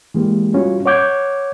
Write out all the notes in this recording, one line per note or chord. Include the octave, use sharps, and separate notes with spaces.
E3 G#3 A#3 G4
G3 C#4 F4 F#4
C#5 F#5 D6 G6 G#6